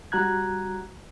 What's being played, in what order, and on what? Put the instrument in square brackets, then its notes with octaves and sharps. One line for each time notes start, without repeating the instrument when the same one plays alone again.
[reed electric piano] G3 F#4 A#5 F#6 G#6